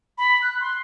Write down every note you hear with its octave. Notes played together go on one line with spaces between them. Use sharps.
B5
F#6
C6